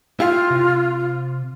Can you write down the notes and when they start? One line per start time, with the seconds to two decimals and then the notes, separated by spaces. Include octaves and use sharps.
0.20 E4 F4 G4 F5
0.51 C3